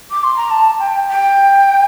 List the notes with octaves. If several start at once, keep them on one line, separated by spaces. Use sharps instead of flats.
D6
C6
A#5
A5
G5
G5